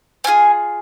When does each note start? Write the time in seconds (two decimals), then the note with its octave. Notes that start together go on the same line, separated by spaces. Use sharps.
0.24 C4 F4 G#4 G#5